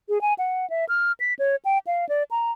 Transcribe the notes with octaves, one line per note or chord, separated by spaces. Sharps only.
G#4
G#5
F#5
E5
F6
B6
C#5
G5
F5
D5
A#5